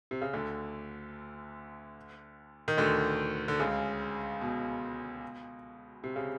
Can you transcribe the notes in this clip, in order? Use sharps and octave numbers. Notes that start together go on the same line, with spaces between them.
C3
C#3
D2 D3
D#3
D2 D3
D3
C#2 C#3
B2
C3
C#3